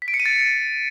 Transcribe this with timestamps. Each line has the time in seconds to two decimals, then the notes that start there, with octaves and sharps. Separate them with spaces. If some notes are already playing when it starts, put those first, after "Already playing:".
0.02 B6
0.08 D7
0.14 C#7
0.20 D#7
0.26 A6